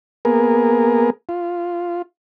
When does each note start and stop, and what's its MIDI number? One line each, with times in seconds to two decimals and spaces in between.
0.25 1.10 58
0.25 1.10 59
0.25 1.10 68
0.25 1.10 70
1.29 2.02 65